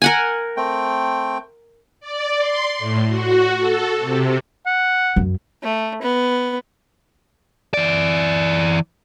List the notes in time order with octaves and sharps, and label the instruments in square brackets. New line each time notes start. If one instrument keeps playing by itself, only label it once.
[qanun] A#4 F#5 G#5
[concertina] A3 C4 G5
[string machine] D5
C6
A2
F#4
A4
C3
[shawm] F#5
[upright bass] F#2
[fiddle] A3
B3
[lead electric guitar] E3 D5